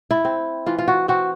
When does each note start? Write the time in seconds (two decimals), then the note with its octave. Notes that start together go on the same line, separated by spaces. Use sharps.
0.11 E4
0.25 C4
0.66 E3 F4
0.78 F4
0.88 F#4
1.08 C4 F#4